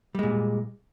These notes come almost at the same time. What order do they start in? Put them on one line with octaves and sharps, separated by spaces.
G3 G#3 A#2